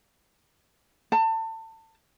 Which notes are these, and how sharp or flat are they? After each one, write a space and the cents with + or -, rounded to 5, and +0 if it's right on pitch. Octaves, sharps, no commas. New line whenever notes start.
A5 +30